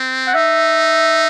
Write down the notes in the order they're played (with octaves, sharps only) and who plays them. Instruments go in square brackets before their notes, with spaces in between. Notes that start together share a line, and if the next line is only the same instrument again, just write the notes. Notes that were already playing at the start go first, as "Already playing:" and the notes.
Already playing: [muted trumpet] C4
[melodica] F#5
[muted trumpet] D#4 [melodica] E5